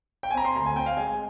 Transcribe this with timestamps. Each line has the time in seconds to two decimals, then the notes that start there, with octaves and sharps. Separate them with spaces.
0.23 G5
0.30 G#5
0.34 C4 A#5
0.45 C6
0.55 D2 A#5
0.66 G#5
0.76 C4 G5
0.86 F5
0.97 G#3 G#5
1.07 G#5